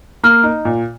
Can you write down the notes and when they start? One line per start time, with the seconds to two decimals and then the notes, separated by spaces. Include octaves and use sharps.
0.24 A#3 F6
0.43 D#4
0.65 A#2